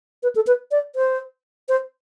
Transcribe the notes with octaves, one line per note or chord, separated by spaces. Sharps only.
B4
A4
B4
D5
C5
C5